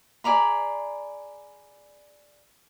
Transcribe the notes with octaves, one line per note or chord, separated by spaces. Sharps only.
G#4 D5 A#5 B5